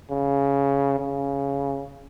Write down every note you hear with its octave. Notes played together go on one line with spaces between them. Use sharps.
C#3
C#3